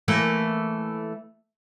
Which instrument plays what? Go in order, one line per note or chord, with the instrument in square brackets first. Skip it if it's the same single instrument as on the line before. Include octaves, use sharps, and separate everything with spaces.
[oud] E3 A3 A#3